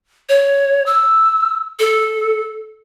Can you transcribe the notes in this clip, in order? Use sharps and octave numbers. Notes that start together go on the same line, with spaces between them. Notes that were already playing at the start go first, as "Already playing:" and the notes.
C#5
E6
A4